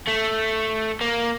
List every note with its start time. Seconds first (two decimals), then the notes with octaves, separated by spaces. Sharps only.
0.08 A3
1.01 A#3